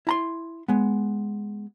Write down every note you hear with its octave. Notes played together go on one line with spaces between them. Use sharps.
E4 A#5 C6
G#3 B3